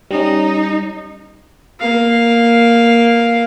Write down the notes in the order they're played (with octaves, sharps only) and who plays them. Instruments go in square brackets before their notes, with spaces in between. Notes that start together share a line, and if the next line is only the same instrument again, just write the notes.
[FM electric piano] G3 C#4 [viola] D#4
[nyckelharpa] A#3 F5